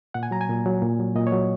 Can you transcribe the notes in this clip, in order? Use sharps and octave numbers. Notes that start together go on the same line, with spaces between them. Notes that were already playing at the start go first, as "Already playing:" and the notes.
A#2 F#5
G#5
F#3 A#5
G#5
A#2
F#3
A#2
F#3
A#2 D#5
C#5
F#3